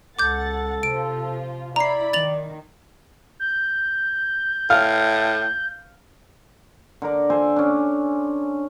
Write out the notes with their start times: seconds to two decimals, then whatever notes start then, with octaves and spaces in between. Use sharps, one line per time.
0.19 C#2 A4 F#5 D6 G6 A6
0.83 C3 F3 F4 D7
1.76 E4 D5 A#5 B5 C7
2.13 D#3 A6 F7 F#7
3.40 G6
4.70 A2 F5
7.02 D3 A#4 D5
7.30 A4 C5 G#5
7.56 C#4 D4